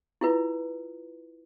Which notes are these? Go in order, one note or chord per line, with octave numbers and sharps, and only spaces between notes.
E4 F4 B4